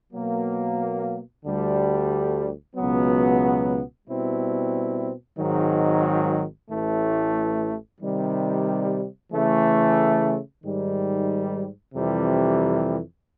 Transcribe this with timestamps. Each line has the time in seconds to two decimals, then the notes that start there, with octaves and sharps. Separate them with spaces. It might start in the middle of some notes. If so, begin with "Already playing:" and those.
0.13 B2 F#3 A#3
1.44 D2 D3 G3
2.76 C#2 B2 F#3 B3
4.07 B2 G3 C4 E4
5.39 G#1 G#2 D#3 F#3
6.70 A1 A2 E3 A3
8.01 C3 D#3 G3
9.32 C#3 E3 A3
10.63 G#2 D#3 G3
11.94 F2 C3 E3 G3